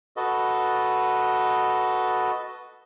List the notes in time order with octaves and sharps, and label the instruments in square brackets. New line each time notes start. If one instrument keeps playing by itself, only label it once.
[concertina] F#4 A4 B4 D#5